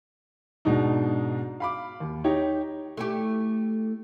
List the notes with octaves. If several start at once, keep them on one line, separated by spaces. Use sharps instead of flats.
G#2 B2 G#3 D4 D#4
F5 B5 D6
D#2
D#4 G4 C#5
A3 E4 G4